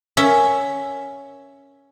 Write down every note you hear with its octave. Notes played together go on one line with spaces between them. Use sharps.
C#4 E5